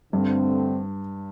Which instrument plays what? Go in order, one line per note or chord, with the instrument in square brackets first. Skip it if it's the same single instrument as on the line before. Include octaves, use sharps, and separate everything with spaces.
[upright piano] G2 [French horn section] D3 A3 C4